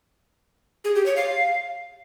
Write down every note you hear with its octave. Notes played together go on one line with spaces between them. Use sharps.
G#4
G4
C#5
F5